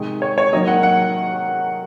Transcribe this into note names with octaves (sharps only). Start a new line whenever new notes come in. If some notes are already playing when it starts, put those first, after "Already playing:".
Already playing: C3 D#3 G#3
C#5
C#5
D#3 F#3 A#3 D#5
F#5
F#5